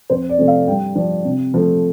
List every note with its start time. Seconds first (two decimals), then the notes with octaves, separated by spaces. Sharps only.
0.10 F2 C5
0.29 D5
0.38 C3 F3 A3 C4
0.48 F5
0.68 G2 G5
0.95 F3 D4
1.24 C3
1.54 F3 A3